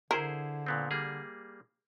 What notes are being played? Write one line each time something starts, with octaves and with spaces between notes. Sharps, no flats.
D3 E4 G#4 A#4 C5
A#2 B3 C4
G3 A#3 G#4